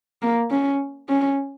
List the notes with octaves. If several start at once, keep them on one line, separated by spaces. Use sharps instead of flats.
A#3
C#4
C#4